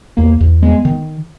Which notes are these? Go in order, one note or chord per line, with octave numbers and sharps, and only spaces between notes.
E2 A#3
E2
G#3 B3
D#3